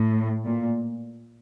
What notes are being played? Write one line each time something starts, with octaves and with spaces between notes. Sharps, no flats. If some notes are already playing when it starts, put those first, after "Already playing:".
Already playing: A2
A#2